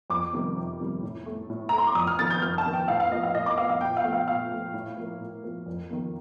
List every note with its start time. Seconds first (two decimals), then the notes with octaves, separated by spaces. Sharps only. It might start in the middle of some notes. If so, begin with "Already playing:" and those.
0.10 F2 D6
0.33 C3 D#3 G3
0.56 F2
0.80 C3 D#3 G3
1.03 A2
1.26 A3
1.50 A2
1.69 A3 A#5
1.78 C6
1.87 D6
1.95 F2 D#6
2.07 F6
2.19 D#3 A#3 A6
2.30 G6
2.42 F2 F6
2.58 A5
2.65 D#3 A#3
2.73 G5
2.88 A2 F5
3.00 F5
3.11 F3 A#3 D#5
3.23 F5
3.35 A2 D#5
3.46 D6
3.58 F3 A#3 F5
3.69 F5
3.81 A#2 G5
3.97 F5
4.04 F3 A3
4.13 F5
4.28 A#2 F5
4.51 F3 A3
4.74 A2
4.97 F3 A#3
5.20 A2
5.44 F3 A#3
5.66 F2
5.90 D#3 A#3